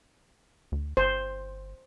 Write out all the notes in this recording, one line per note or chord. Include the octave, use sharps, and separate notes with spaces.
D2
G1 C5